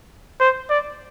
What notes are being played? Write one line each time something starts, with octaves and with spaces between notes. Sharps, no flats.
C5
D5